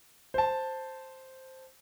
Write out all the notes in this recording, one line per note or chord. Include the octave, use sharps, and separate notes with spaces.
C5 A5